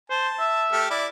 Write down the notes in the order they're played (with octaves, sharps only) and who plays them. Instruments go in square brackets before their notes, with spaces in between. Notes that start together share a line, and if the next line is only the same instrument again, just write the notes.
[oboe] C5 [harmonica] A5
[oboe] E5
[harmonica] A3 G4 F6
E4 D5